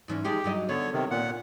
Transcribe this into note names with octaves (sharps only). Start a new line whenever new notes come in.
G#2 E3 C#4
F3 G#3 D#4 G4
G2 F#3 D#5
D3 B3 C#5
C3 D#3
A#2 F#5